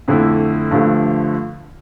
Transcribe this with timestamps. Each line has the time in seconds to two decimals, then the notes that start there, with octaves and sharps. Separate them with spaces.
0.08 F2 D3 A3 E4
0.71 G2 D3 F3 A3